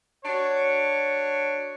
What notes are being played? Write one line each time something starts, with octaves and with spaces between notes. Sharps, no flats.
D4 F#4 C#5